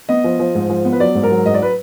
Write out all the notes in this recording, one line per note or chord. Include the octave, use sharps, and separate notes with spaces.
B3 D#5
F3
F3
G#2
F3
B3
B4
F#3 D5
G#2
A#4
F#3
G#2 D#5
D5
B4